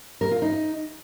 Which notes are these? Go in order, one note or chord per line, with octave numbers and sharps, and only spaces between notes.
A#4
F4
D#4